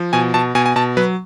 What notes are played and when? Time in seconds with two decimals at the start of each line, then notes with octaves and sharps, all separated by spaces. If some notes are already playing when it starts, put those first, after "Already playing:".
Already playing: F3
0.13 B2 G#5
0.34 B2 A5
0.55 B2 G#5
0.66 G#5
0.76 B2 A5
0.97 F#3 B4